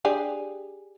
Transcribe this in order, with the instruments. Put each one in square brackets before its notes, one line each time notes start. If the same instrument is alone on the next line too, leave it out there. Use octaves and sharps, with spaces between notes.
[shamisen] D4 G4 G#4